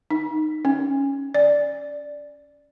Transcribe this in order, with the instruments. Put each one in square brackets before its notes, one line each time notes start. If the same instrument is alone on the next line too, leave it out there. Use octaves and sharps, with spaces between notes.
[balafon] D#4
C#4
D5